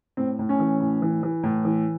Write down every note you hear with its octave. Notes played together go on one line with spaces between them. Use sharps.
A2 C4
A2
C#4
E3
A2
E3
E3
A2
E3